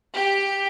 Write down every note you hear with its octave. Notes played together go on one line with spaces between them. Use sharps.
G4